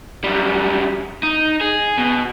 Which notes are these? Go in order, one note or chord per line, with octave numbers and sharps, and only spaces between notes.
F#2 G3
D#4
G#4
B2